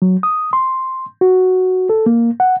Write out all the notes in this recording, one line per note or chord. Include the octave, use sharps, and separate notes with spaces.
F#3
D#6
C6
F#4
A4
A#3
F#5